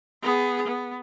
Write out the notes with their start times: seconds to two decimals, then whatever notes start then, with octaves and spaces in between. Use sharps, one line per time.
0.23 B3 G#4
0.67 B3